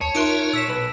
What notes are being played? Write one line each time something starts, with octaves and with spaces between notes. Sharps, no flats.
D#2 C#5 A5
D#4 F4 A#4 E5 C6 F#6 D7 D#7
A#2 E6 B6 E7
B1 B4